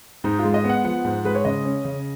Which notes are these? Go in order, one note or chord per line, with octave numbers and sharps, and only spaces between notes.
G#2 D#4
F4
G#3
D#5
B3
F#5
F3 F#5
G#2
G#3 B4
C#5
C#3 D#5
C#4
C#3